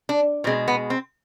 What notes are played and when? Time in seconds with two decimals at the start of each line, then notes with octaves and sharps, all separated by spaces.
0.09 D4
0.44 B2 G#3 C4
0.68 B3
0.90 C4